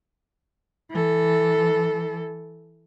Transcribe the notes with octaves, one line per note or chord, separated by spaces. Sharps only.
E3 A4